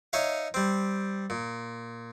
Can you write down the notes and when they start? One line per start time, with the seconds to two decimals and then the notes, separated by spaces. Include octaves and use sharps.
0.13 D#4 C#5 E5 F5
0.54 G3 C4
1.30 A#2